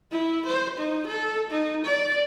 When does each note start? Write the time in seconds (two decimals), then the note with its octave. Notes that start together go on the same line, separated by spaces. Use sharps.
0.11 E4
0.46 C5
0.78 D#4
1.07 A4
1.50 D#4
1.85 D5